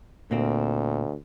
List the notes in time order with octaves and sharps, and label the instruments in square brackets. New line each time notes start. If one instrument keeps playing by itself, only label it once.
[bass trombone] D2 [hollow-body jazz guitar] A#2 A#3 C4